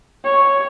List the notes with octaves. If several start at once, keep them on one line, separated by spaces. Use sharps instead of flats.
C#5